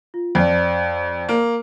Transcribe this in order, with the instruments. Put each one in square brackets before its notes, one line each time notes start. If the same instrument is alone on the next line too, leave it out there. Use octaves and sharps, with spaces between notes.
[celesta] F4
[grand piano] F2 [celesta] C5 D5
[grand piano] A#3